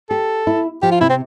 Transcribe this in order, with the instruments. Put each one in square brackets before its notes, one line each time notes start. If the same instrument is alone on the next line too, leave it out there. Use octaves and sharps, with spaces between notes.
[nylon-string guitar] G4 [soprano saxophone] A4
[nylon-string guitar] E4
[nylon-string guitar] F3 [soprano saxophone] G4
[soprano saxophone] F4
[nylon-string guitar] C3 [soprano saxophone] E4
[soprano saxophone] C4